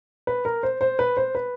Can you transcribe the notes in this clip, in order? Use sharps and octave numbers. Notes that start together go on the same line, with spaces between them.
B4
A#4
C5
C5
B4
C5
B4